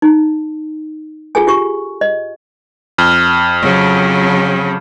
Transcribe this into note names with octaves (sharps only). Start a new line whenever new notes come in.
D#4
F4 G#4 A4 G#5
F4 G4 C#6
D#5
F2 F6 G7
C#3 F#3